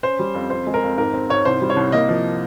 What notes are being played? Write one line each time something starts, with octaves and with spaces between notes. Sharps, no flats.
C#4 C5
G3
F2
F2 C5
G#3
A#4
F2
G#2 A#4
C4
G#2 C#5
C2 C5
G3
C#5
C2
A#3 D#5
F3